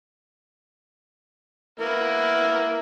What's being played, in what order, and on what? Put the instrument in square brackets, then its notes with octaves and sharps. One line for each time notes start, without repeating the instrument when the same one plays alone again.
[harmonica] A#3 B3 A#4 [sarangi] E4